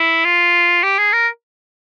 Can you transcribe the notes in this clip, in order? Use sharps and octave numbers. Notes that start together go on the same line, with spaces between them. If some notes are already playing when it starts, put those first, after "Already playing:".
Already playing: E4
F4
G4
G#4
A#4